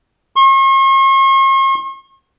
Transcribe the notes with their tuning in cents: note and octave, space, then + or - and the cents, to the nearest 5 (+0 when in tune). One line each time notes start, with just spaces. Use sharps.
C#6 -45